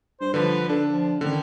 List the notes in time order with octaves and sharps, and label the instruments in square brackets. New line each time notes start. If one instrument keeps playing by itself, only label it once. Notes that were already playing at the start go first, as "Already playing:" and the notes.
[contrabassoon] G2 [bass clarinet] C5
[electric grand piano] D3 F3 [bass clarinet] B4
[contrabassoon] D3 [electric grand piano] D4 [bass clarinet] A4
[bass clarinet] F3
[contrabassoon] A1 [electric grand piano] D3 [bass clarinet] D#3